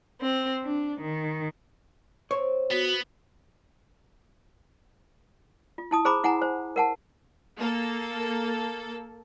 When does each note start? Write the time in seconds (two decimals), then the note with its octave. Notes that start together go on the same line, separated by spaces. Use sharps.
0.21 C4
0.65 D4
1.00 D#3
2.31 C4 C#5
2.72 B3 F#4
5.78 F4
5.91 E4 A5 D#6
6.05 G#4 C5 A#5 B5 D6
6.24 E4 F#5 G#5 A#5
6.42 C5
6.76 A#4 F#5 A5
7.59 A#3 A4